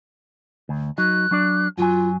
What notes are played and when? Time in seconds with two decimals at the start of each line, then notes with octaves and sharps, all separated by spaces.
0.69 D2
0.98 F#3 D#4 F#6
1.31 F#3 D4 D5
1.78 F#2 F#3 F4 G#5